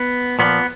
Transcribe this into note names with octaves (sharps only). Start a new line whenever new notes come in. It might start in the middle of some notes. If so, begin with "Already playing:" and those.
Already playing: B3
A#2 F3 B3